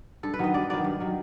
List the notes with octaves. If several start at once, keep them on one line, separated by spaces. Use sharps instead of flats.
G2 A4
B4
D#3 F#3 B3 D#5
G2 D5
D#3 F#3 B3 D5
G2
D#3 F#3